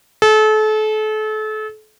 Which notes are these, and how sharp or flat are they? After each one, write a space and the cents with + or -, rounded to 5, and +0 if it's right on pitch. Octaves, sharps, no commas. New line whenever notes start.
A4 -35